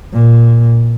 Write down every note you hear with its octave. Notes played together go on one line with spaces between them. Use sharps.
A#2